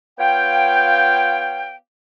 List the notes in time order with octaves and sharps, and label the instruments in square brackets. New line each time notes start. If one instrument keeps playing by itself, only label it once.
[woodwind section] B3 F4 C#5 F5 G5